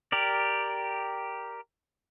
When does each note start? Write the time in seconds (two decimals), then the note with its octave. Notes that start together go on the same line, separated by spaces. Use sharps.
0.12 G4 A#4 D5